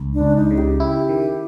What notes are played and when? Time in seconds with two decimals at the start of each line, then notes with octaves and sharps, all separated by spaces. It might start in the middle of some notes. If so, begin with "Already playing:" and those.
Already playing: C#2
0.14 D4
0.21 C#2
0.36 D#4
0.51 C#3
0.58 G4
0.80 E4
1.09 D#3